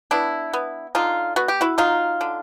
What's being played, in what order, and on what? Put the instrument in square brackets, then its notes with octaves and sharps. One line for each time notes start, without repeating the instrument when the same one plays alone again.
[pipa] B3 D4 E4
B3
D3 D#4 F4
B3 F#4
G4
E4 F#4
F#3 D#4 F4
D3